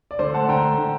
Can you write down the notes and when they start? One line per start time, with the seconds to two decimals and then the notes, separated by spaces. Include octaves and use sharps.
0.11 D5
0.19 D3 C5
0.34 A3 F#5 A5
0.48 D3 G5 A#5
0.64 A3
0.78 D3